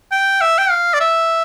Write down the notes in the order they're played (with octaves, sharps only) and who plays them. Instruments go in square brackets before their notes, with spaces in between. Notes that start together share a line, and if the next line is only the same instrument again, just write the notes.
[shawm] G5
E5
G5
F5
D5
E5